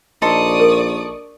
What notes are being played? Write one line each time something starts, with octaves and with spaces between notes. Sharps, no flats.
A#1 D#4 A4 D5 C6 C#6 D#6
A#4